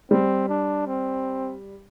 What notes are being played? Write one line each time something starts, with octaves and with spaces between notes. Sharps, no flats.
G3 C4
D4
C4